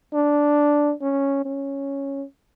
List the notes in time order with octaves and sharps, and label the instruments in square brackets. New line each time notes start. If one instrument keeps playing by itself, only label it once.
[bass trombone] D4
C#4
C#4